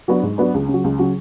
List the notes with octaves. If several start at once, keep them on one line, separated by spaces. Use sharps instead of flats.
F#3 B3 D4
G#2
F#3 B3 D4
C#2
C#3
F#3
C#2
C#3 F#3